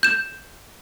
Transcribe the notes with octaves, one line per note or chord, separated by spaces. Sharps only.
G6 E7